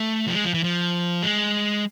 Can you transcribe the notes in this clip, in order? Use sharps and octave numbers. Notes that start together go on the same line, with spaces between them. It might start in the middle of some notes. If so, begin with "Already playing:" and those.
Already playing: A3
F3
G#3
F3
E3
F3
G#3